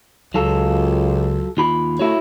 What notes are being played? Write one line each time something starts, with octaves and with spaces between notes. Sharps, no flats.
C#2 F#3 F4 A4
D#2 F4 B5
A3 E4 F#4 C#5